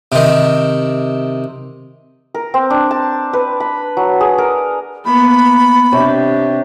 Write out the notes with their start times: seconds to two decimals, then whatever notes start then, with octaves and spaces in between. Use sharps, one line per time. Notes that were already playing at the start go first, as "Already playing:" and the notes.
0.12 C3 D#3
2.35 A#4
2.54 C4
2.70 D4
2.91 A5
3.33 B4
3.60 B5
3.97 F#3
4.21 G#4
4.38 A#4
5.05 A#3 B3 B5
5.92 C3 D4 G4 C#5